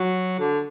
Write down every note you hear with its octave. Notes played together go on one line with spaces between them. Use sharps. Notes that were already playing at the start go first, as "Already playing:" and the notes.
Already playing: F#3
D3